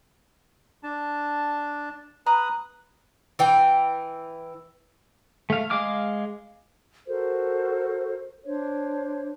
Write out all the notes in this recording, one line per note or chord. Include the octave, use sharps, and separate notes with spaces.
D4 A5
B4 A#5 D#6 F#6
E3 G5
A3 F5
G#3 F5 D6 F6
F#4 A4 A#4 C5
D4 C5 C#5